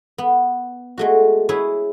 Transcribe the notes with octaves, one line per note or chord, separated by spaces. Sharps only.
B3
G#3 A3 F#4
E4 G#4 B4 C#5